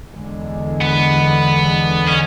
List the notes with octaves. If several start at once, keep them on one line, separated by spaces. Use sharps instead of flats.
E2 D3 G#3
B3
C#4